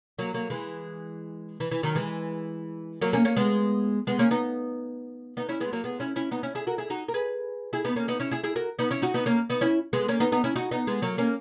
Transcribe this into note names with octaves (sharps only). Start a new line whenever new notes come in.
F#3 A#3
F#3 A#3
E3 G#3
E3
E3
D#3 F#3
E3 G#3
F#3 A#3
A#3 C#4
A#3 C#4
G#3 B3
G#3 B3
A#3 C#4
B3 D#4
B3 D#4
C#4 E4
G#3 B3
F#3 A#3
G#3 B3
C#4 E4
C#4 E4
B3 D#4
C#4 E4
E4 G#4
F#4 A#4
E4 G#4
D#4 F#4
A#4
G#4 B4
E4 G#4
B3 D#4
A#3 C#4
B3 D#4
C#4 E4
E4 G#4
E4 G#4
F#4 A#4
B3 D#4
C#4 E4
D#4 F#4
B3 D#4
A#3 C#4
B3 D#4
C#4 E4
G#3 B3
A#3 C#4
B3 D#4
B3 D#4
C#4 E4
D#4 F#4
B3 D#4
G#3 B3
F#3 A#3
A#3 C#4